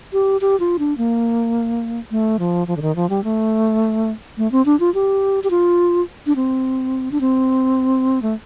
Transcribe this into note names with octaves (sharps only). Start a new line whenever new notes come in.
G4
G4
F4
D4
A#3
A3
F3
F3
D3
D#3
F3
G3
A3
A3
C4
D4
F4
G4
G4
F4
D4
C4
D4
C4
A3